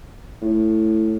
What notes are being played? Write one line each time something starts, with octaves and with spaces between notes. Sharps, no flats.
A2